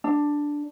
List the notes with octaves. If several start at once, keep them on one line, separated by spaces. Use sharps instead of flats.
D4